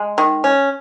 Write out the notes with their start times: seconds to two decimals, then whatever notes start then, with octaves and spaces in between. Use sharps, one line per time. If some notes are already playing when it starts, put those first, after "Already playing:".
Already playing: G#3
0.18 D#3
0.44 C#4